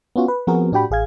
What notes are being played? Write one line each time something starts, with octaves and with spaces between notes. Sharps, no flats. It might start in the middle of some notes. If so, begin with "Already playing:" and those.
B3 C#4 F4 F#4
B4
F3 B3 C4 F#4 G#4 A#4
A2 D4 F#4 G4 G5 B5
A1 G#4 F5 G#6